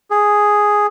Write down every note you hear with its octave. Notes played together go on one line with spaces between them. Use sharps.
G#4